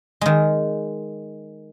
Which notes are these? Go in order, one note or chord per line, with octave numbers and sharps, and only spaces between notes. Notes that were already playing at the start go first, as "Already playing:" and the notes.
D#3 G#3